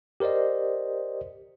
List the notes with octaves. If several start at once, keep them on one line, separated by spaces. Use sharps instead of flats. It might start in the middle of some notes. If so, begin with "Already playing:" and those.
G4 A#4 C5 D5 D#5